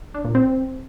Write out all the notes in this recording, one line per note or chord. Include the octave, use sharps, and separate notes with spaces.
D4
A#2
C4